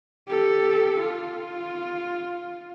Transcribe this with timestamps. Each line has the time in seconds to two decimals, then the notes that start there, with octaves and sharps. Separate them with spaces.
0.28 G4 A4
1.00 F4